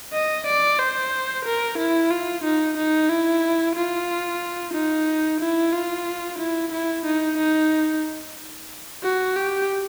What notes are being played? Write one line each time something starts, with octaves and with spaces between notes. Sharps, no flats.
D#5
D5
C5
A#4
E4
F4
D#4
D#4
E4
F4
D#4
E4
F4
E4
E4
D#4
D#4
F#4
G4